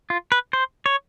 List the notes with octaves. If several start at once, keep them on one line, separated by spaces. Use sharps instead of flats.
F4
B4
C5
C#5